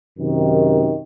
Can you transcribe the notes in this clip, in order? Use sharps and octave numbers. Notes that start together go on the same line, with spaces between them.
F#2 C3 D#3